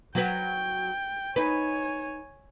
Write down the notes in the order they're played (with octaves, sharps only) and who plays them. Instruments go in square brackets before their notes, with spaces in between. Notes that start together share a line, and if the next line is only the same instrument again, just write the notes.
[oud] F#3 F#4 B4 [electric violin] G5
[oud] D#4 B4 [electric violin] C#5 G#5